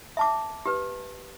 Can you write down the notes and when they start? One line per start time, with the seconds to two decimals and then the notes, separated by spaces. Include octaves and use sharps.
0.17 E5 A5 D6
0.66 G4 B4